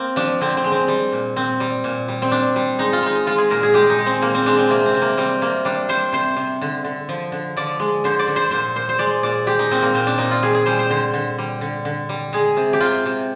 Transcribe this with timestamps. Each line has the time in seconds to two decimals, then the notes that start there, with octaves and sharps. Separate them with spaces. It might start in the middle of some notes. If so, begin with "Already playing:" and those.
Already playing: A#3 C4
0.16 F3 D4
0.41 D3 C4
0.57 C4
0.64 G#3
0.72 C4
0.88 G3
1.12 A#2
1.36 A#2 C4
1.60 G3
1.84 A#2
2.08 G3
2.22 C4
2.31 A#2 D4
2.56 G3
2.79 G#3 D#4
2.93 F4
3.02 G#3 D#4
3.27 G#3 F4
3.38 G#4
3.50 A#2 A#4
3.63 G#4
3.74 G#3 G4
3.90 D#4
3.99 G#3
4.06 C4
4.22 A#2 A#3
4.35 C4
4.46 G#3 D4
4.59 C4
4.70 C3 A#3
4.86 C4
4.94 C3
5.02 A#3
5.17 G3 C4
5.41 C3 A#3
5.65 G3 D4
5.89 G3 C5
6.13 C3 C5
6.36 C3
6.61 D3
6.84 D3
7.09 F3
7.32 D3
7.57 F3 D5
7.80 G#3
8.04 D3 C5
8.19 D5
8.28 D3
8.36 C5
8.51 A#2 C5
8.76 A#2 C5
8.89 C5
8.99 G#3 D5
9.23 A#2 D5
9.47 G#3 G4
9.59 D#4
9.71 A#2 C4
9.82 A#3
9.95 A#2 C4
10.07 D4
10.18 A#2 D#4
10.31 F4
10.43 G3 G#4
10.55 G#4
10.66 G3 C5
10.79 C5
10.90 D3 C5
11.14 D3
11.39 G3
11.61 D3
11.85 D3
12.09 G3
12.33 G#3 G#4
12.57 C3
12.73 G4
12.81 C3 F4
13.06 C3